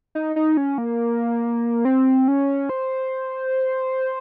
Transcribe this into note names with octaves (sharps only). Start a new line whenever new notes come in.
D#4
D#4
C#4
A#3
C4
C#4
C5